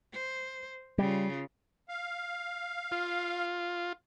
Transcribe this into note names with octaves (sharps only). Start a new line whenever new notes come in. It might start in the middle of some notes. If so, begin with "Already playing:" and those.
C5
C#3 G3 F4
F5
F4